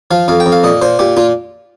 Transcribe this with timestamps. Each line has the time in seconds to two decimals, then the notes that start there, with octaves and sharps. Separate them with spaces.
0.11 F3 F5
0.28 F2 F5
0.40 G5
0.46 F2
0.52 F5
0.64 A#2 D#5
0.82 A#2 C5
0.99 A#2 G4
1.17 A#2 F4